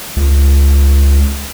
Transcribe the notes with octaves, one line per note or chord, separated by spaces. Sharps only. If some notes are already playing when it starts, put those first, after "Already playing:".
C#2